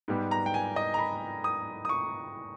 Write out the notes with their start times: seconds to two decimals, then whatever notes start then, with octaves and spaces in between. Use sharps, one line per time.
0.08 G#2 G3 B3
0.31 A#5
0.46 G5
0.54 G#5
0.76 D#5
0.94 A#5
0.99 B5
1.44 D#6
1.85 D#6
1.89 C#6